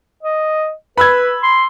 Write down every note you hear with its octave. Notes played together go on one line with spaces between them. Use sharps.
D#5
B4 B5 E6 G#6
C6